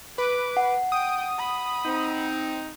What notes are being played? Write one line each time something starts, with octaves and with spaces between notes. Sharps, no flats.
B4 D6
F#5
G5 D#6
B5
C4 D#4